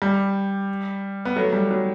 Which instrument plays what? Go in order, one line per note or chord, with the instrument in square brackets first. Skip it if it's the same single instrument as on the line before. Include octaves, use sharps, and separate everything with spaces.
[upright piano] G3
B3
F#3 A3
G3
F#3